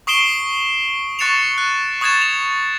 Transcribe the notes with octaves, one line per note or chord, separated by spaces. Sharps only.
C#6 D#6 C7 D7 E7 G7
C#6 F#6 A6 C#7 E7 F7
F#6
C#6 D#6 F#6 G#6 A6 E7
E7 F7